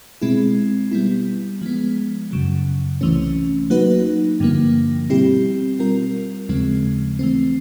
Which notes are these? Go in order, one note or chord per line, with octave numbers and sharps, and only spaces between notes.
B2 G#3 C4 E4
G3 B3 E4
F3 G#3 B3
F#2 C#3 F#3
C2 C3 E3 A3 C#4
F#3 A#3 D#4 F#4 B4
G2 D3 F3 A#3
B2 G3 C4 E4 G4
G3 C4 F4 A#4
D#2 C#3 F3 G#3 C4
E3 A3 C4